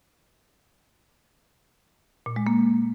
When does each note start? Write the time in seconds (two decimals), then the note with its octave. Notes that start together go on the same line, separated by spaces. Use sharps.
2.26 A#2
2.36 G#3
2.47 A#3